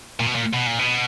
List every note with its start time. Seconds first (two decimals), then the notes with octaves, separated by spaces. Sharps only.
0.20 A#2
0.26 B2
0.35 A#2
0.54 B2
0.66 A#2
0.79 B2